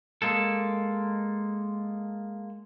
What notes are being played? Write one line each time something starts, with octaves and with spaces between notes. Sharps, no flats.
G#3 A#3 A4